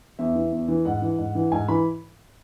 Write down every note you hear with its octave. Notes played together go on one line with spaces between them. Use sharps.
E2 E5
E3
E2
E3
G#2 F#5
E3
G#2
E3
G#2 G#5
E3 B5